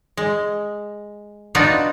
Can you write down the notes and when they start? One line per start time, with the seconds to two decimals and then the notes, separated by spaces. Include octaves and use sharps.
0.17 G#3
1.55 B3 D4 D#4 F4 F#4